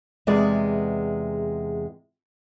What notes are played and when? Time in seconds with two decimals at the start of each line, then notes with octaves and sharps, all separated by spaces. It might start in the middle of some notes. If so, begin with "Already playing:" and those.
0.27 E2 C3 G#3 G#4 B4 D5